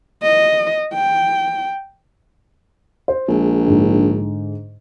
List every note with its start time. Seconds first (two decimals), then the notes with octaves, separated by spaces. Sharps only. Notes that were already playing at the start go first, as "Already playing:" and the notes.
0.23 D#5
0.94 G5
3.08 C5
3.28 A#1 G#3
3.66 G#2 D3